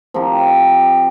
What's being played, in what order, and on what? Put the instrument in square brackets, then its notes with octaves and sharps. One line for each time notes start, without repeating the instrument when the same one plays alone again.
[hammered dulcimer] F3 C4 G4 A#4